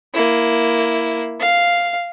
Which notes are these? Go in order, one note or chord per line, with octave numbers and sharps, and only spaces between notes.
A#3 E4
F5